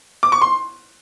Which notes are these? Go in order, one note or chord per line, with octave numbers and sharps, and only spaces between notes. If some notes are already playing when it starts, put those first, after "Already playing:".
D6
C#6
C6